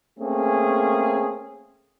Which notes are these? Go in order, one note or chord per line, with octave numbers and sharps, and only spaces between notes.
A3 A#3 C4 C#4 G#4